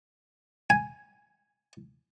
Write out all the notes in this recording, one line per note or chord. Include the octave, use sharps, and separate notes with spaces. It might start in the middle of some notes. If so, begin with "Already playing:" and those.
G#5